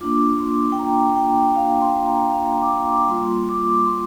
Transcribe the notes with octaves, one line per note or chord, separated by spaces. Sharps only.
A#3 D4 F4 D6
C6
G5
A#5
G5
F5
C6
A#5
F5
A#5
D6
C6
D6
G3 A#3 F4 C6
D6
C6